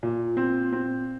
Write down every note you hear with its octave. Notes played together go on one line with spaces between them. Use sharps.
A#2
C4
C4